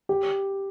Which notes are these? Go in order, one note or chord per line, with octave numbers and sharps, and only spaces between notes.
G4